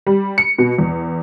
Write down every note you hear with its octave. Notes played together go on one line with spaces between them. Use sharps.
G3
C#7
B2
E2